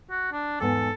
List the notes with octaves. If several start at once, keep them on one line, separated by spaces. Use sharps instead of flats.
F#4
D4
E2 G#2 B3 A4